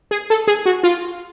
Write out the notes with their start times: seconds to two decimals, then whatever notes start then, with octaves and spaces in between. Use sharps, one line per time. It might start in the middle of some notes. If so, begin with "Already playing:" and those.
0.11 G#4
0.30 A4
0.48 G#4
0.66 F#4
0.83 F4